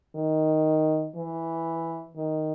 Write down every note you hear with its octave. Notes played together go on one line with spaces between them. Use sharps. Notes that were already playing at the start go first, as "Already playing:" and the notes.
D#3
E3
D#3